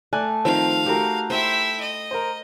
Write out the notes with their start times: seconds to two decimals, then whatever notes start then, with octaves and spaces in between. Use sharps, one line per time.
0.13 A3 D5 G#5 F#6
0.45 D#3 F3 C4 F5
0.86 A3 F#4 G4 A#4
1.30 E4 C5 E5 G5
1.80 D#5
2.11 A#4 C5